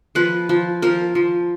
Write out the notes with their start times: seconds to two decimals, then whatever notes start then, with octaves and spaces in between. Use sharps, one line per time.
0.15 F3 B4
0.49 F3
0.82 F3 A#4
1.15 F3